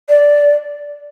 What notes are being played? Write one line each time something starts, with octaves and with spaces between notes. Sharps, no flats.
D5